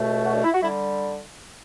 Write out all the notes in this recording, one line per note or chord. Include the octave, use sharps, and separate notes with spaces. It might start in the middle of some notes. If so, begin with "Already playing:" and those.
Already playing: C#2 B2 A3
F#4
D4
E4
F#4
D3 G3 E4